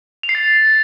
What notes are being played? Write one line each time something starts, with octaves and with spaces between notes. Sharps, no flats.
F7
C7
A6